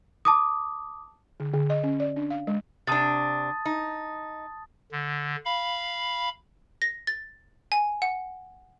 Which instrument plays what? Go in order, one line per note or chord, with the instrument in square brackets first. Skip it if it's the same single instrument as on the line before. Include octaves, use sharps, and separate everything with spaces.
[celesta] A5 D6 D#6
[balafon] D3
D3
D#5
C#4
D5
D4
F5
G#3
[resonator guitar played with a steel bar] C3 D4 [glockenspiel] A5 D#6 A6
[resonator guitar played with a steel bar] D#4
[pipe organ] D3
F5 B5
[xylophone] A#6
A6
G#5
F#5